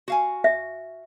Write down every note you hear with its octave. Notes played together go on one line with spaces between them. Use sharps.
F#4 F5 G#5
E5